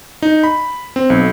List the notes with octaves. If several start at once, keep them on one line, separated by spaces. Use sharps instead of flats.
D#4
B5
C4
B1